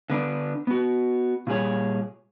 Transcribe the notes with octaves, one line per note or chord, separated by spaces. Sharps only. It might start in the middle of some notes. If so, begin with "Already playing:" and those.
D3 B3 D4
B3 F#4
A#2 G3 G#4 C#5